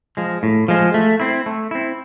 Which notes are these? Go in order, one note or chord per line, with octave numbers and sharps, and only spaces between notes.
F3 G#3
A2
F3 G#3
A3
C4 E4
A3
C4 E4